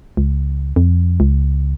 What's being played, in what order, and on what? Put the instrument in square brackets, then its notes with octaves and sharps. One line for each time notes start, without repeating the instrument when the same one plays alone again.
[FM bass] C#2
F2
C#2